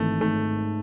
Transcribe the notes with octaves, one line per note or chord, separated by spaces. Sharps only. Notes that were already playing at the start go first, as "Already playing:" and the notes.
Already playing: G#1 E3 A3
G#2 A3